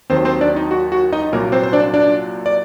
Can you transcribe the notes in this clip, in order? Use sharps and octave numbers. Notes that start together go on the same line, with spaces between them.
D#2 D#3 F#3 C4 C5
C4 C5
D4 D5
D#4
F#4
F#4
D#4 D#5
C2 A#2 F#3 A#3 A#4
C4 C5
C5
D4 D5
D4 D5
D5